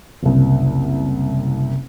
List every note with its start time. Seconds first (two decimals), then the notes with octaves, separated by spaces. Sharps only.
0.23 F#1 C2